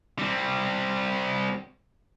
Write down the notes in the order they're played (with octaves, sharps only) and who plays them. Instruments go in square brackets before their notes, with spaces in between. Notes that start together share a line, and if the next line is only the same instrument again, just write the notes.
[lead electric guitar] G3 C4